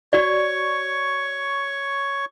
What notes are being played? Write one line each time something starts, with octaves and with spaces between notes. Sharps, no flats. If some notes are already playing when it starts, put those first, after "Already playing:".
F#4 C#5 D5 C#6